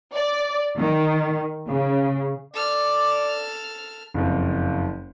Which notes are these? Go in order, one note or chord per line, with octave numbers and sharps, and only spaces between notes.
D5
D#3
C#3
A4 D5 F6
F#1 F2